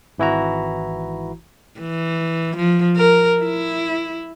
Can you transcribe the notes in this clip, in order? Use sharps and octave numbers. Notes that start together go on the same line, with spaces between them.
G#1 E3 E4 F#4 A#5
E3
F3
A#4
E4